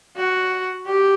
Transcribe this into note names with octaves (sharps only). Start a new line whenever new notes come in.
F#4
G4